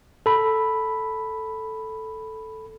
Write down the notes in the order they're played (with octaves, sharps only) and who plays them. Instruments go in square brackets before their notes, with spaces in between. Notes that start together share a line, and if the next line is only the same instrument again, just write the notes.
[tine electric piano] A4 B5